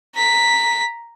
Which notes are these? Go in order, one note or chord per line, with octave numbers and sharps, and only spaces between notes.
A#5 B6